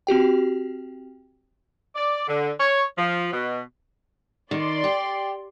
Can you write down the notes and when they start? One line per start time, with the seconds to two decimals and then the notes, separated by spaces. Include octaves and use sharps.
0.07 C4 F#4 G4 G5
1.96 D5
2.28 D3
2.60 C#5
2.97 F3
3.33 B2
4.51 D#3 D5 C6
4.84 G4